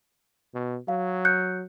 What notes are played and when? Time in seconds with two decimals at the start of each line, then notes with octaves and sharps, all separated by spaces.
0.55 B2
0.88 F#3 F5
1.25 F#6 G6 C#7